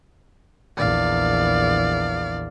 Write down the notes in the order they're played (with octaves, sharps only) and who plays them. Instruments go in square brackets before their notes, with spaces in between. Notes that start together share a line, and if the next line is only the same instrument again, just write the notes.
[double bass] A#1 E2 [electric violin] D5 F5